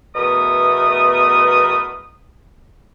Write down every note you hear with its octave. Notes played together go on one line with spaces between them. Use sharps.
E2 B2 A3 A#4 B5 D#6